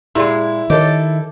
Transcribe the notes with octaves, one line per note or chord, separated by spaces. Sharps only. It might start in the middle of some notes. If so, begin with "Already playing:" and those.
A#2 G#3 E4 G4 G#4 D5
D#3 G4 A4 A#4 C#5 D#5